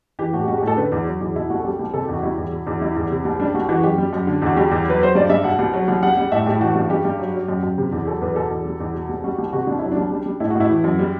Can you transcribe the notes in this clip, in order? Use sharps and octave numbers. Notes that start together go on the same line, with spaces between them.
E3 G4
A2 F#4
G4
G3 F#4
G4
A2 A4
D3 B4
E2
F#3
E2
B2 E4
C2 F#4
A4
G3 G4
C2
C3 A4
E2 G4
F#4
G3 E4
E2
B2
E2
G3 E4
E2
C3
C2
G3 D4
C2 F#4
E3 F#4
F#2 G4
G3
F#2
D3
E2 F#4
G3 G4
E2
F#3 B4
F#3 C5
G2 D5
G2 E5
B2 F#5
C2
F#3
C2
G3 F#5
G3
A2 E5
A2 G4
E3 F#4
G2
G3 G4
G2
F#3
F#3
F#2
F#2
C3
E2
F#3 A4
E2 B4
B2 A4
E2
G3
E2
B2
C2
G3 F#4
C2
C3 F#4
C2 D4
F#3 E4
D4
C2
G3
G3
A2 E4
F#4
A2 E4
E3
F#2
G3